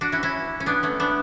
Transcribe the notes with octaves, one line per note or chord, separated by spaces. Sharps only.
D4 F#4
C#4 E4
C#4 E4
C#4
B3 D4
A3 C#4
B3 D4